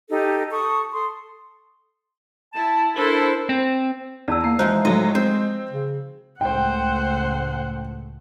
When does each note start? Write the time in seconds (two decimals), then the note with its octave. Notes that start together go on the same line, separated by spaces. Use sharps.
0.09 D#4 G4 A4
0.50 A4 C#6 D#6
0.92 A4 C6 D#6
2.54 E4 A5
2.97 D4 E4 A4 A#4 C5
3.49 C4
4.28 E2 D5 A5 E6
4.44 A#3 C7
4.59 E3 F3 G#3 D#4 F#4 C5
4.85 A2 F#3 A3 F#4 D#5
5.15 C4 C5
5.71 C#3
6.41 C#2 A2 A3 C5 F#5 G5